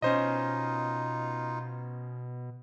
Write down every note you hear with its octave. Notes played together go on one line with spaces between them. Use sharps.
B2 C#4 D#4 F4 C5 D#5